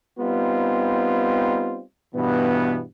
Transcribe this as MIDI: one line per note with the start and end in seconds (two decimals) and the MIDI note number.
0.20 1.82 55
0.20 1.82 59
0.20 1.82 60
0.20 1.82 63
0.20 1.82 65
2.15 2.83 43
2.15 2.83 47
2.15 2.83 52
2.15 2.83 59